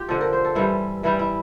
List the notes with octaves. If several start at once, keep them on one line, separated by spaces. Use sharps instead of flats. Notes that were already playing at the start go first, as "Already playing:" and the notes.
Already playing: F4 G4
D3 F3 C4 A4
A#4
C5
A4
G2 E3 G3 E4
G2 E3 G3 E4
E4